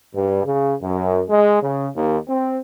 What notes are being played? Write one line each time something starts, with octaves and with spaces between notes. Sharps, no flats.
G2
C#3
F#2
G#3
C#3
D#2
C4